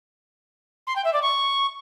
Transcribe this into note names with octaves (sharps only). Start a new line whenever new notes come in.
C6
G5
E5
D5
C#6